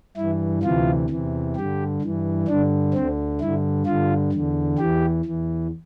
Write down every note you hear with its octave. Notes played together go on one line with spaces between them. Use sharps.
G2 E3 E4
D2 C3 E3 F4
E2 C3 E3
G2 D3 G4
G2 E3
G2 D3 D4
D2 D3 C4
G2 D3 E4
G2 D3 F4
E2 D3
E2 E3 G4
E2 E3